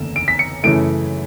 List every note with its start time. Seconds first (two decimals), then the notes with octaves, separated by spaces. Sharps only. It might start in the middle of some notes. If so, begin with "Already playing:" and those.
Already playing: F#1 E2 D3 A3 E7
0.16 D7
0.28 B6
0.39 C#7
0.64 F#2 C#3 E3 A3 D7